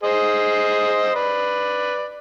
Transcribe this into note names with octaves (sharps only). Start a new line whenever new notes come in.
G#4 C5 D#5
B4 D5